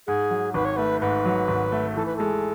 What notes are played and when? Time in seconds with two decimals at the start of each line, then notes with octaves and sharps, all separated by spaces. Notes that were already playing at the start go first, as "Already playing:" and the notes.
0.07 G#2 G#4
0.30 F#3
0.54 G#1 B4
0.65 C#5
0.77 A3 B4
1.01 G#2 B4
1.25 F#3
1.48 G#1
1.72 A3
1.96 E3 A4
2.06 B4
2.16 G#3 A4